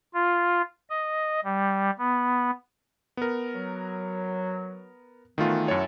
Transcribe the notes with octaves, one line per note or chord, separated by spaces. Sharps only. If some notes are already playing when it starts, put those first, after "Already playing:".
F4
D#5
G3
B3
B3 A#4
F#3
F#2 D#3 E3 A3 B3 F4
F#2 E3 C#5 F#5 A5